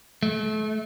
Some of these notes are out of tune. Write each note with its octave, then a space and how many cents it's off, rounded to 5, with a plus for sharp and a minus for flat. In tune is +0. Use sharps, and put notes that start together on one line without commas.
A3 -35